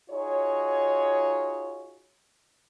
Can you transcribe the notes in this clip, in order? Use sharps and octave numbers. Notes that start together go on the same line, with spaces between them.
D#4 F4 F#4 G#4 C#5